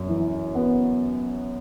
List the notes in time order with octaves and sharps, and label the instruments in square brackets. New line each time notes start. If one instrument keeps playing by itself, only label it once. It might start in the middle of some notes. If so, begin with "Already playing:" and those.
Already playing: [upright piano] F#2
E3
B3